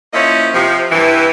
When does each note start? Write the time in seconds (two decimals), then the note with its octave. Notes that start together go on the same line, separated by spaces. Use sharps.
0.13 F3 A#3 C#4 E4 D#5
0.53 C3 F3
0.91 G2 E3